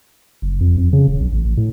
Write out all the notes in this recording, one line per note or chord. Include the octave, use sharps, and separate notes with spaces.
F#1
F2
F2
C#3
D#1
B1
A1
A1
A2